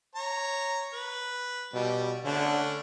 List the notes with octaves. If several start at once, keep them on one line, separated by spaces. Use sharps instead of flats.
C#5 A#5
B4
B2 G3
D3 A3 C#4 D4